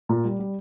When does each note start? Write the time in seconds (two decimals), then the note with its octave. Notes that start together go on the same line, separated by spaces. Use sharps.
0.09 A#2
0.24 G3
0.39 G3